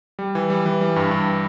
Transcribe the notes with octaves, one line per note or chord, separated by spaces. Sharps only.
G3
E3
G3
E3
G3
G2
G2